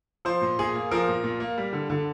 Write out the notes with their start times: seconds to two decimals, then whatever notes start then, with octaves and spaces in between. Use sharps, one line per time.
0.25 F3 C5
0.41 A#2
0.59 A#2 G#4
0.75 A#3
0.91 F3 A#4
1.08 A#2
1.24 A#2
1.40 A#3
1.58 G3
1.73 D3
1.90 D3